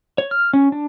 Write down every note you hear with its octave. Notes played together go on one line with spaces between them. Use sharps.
C#5
F6
C#4
D4